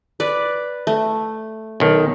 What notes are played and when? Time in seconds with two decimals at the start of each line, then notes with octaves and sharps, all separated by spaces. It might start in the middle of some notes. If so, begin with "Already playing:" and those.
0.20 B4 D5
0.87 A3
1.80 B1 D#3